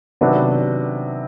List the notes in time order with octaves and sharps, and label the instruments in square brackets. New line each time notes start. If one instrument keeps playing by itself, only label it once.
[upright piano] C3 D#3 F#3 B3 D4